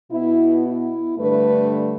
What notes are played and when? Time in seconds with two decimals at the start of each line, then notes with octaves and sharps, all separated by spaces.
0.11 B2 B3 E4
0.66 E4
1.18 G2 D3 A3 B4